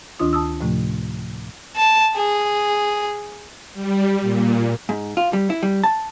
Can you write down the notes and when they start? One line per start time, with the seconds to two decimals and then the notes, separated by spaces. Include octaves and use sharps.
0.19 D2 D#3 D4 F4 D#6
0.33 A5 D#6 E6
0.61 A2 C3 F3 A3
1.76 A5
2.15 G#4
3.74 G3
4.22 A#2
4.89 G#2
5.17 F4
5.33 G3
5.50 E4
5.63 G3
5.84 A5